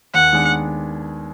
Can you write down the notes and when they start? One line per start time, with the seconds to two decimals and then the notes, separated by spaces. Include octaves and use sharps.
0.14 D#2 F#5
0.33 D#3 G#3 B3 D4